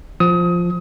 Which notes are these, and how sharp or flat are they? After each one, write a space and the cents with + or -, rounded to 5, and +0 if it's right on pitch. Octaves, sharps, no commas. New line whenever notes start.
F3 +0 D#6 +25